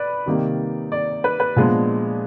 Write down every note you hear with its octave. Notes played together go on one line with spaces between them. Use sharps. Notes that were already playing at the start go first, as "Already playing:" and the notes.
Already playing: B4 D5
C3 D#3 G3 A#3
D5
B4
B4
A#2 F3 G#3 B3 D4